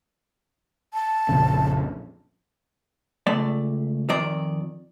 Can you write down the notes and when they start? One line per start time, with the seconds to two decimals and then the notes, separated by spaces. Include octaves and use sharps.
0.93 A5
1.29 A#1 F2 C#3
3.27 C#2 A3 D5
4.09 F2 D#3 D5 A#5